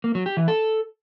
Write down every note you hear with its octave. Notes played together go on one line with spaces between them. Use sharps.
A#3
F#3
G4
E3
A4